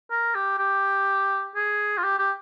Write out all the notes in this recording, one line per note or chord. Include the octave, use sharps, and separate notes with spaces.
A#4
G4
G4
G#4
F4
G4
G4